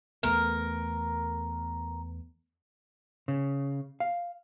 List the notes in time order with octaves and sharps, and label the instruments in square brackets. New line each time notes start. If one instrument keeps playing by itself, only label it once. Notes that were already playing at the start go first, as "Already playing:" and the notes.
[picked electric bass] E2 A3 B3 [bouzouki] A#4
[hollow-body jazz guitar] C#3
F5